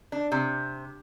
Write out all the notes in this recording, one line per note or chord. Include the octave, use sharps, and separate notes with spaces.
D4
C3